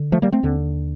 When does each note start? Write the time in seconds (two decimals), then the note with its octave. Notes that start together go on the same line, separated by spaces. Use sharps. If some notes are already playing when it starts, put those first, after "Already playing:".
Already playing: D3
0.12 F3 A3
0.22 G3 A#3
0.32 A3 C4
0.43 D#2 D3